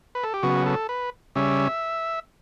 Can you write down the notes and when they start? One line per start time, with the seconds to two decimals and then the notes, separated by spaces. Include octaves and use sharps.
0.15 B4
0.24 A4
0.34 G4
0.43 C#3 F#3 B3 F#4
0.66 A4
0.89 B4
1.35 C#3 G3 C#4 E5